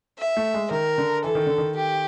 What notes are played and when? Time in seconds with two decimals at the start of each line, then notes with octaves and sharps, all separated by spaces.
0.19 E5
0.37 A3
0.54 G#3
0.71 D#3 A#4
0.98 D3
1.24 E3 A4
1.35 D#3
1.47 D3
1.58 D#3
1.76 G4